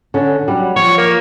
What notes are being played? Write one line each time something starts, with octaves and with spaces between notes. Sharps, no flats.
D3 C#4
F#3 G3
F3 C#5
A#3